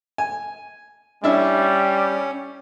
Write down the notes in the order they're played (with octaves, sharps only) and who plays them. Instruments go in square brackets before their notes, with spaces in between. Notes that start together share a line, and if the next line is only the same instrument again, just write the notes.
[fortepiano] G#5
[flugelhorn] G3 [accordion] C#4 [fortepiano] D4 E4 E5